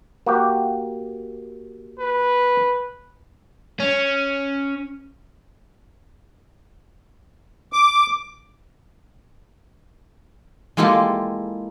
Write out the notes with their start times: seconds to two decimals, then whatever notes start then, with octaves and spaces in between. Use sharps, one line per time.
0.26 A#3 F#4 G4
2.00 B4
3.80 C#4
7.73 D6
10.77 G#3 A#3 E4 F4 G4 A4